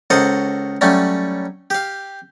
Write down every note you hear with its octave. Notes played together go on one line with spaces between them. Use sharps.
C#2 F#4 A4 A#4 C5 D#5
F#3 G3 A3 C#4
G4 F5